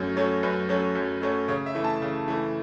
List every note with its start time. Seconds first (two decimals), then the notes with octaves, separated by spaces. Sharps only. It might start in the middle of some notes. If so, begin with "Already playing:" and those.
Already playing: F#2 F#3 A3 C#4
0.16 F#3 A3 C#4
0.43 F#2 B4
0.69 F#3 A3 C#4
0.95 F#2
1.22 F#3 A3 C#4
1.48 C#3 C#5
1.66 E5
1.75 E3 A3
1.84 A5
2.02 C#3
2.28 E3 A3